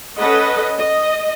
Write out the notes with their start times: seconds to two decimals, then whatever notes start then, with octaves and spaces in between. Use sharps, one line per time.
0.18 C#4 A4 B4 D#5 F#5
0.78 D#5